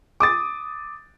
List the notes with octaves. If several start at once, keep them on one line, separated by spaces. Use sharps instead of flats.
D6 D#6 A6